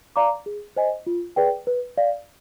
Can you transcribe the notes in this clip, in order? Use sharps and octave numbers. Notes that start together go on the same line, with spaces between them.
D5 F5 A#5 D6
G#4
C5 D#5 G#5
F4
G#4 B4 D5 G5
B4
D5 F5